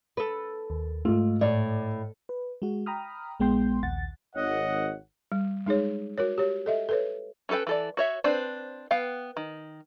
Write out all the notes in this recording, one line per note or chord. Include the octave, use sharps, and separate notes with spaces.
A4 B4
D#2
G#2 A3 F4
A2 D5
B4
G#3 F#4
G5 A#5 B5 D#6 F6
A#1 G#3 B3 G5 C6 G6
A#1 D#2 F#5 A6
G#1 C#5 D#5 F#5
G3
G#3 D#4 G#4 C#5
F#4 A#4 C#5
G4 C#5
A4 D#5 E5
A4 B4 C#5
C#4 E4 A4 B4 G5
E3 A4 D5
F#4 C#5 E5
C4 D4 B4 C5 D5
B3 F5 G5
D#3